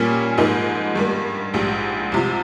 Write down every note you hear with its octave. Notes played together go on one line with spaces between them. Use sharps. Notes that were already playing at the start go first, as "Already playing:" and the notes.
Already playing: A#2 G3 A#3 C#4
G#2 F3 A#3 D#4
G2 G3 A#3
A#1 G#2 G3
C2 C3 F3